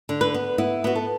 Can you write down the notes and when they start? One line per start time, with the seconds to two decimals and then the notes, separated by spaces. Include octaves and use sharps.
0.09 D3
0.21 B4
0.34 B3
0.58 B3 E4
0.84 B3 F#4
0.95 A4